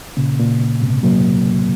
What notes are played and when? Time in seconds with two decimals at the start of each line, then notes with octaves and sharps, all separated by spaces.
0.17 A#2 C#3
0.39 A#2
0.61 A#2
0.81 G#2 C3
1.03 F#3 A#3